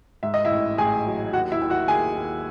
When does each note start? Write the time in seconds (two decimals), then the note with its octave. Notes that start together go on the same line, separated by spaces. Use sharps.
0.23 G#2 E5
0.34 D#5
0.45 E4 E5
0.51 A1
0.78 A1 G#4 G#5
1.06 F#3
1.33 D#2 F#4 F#5
1.52 E4 E5
1.61 D#2
1.70 F#4 F#5
1.88 D#2 G#4 G#5
2.16 D#2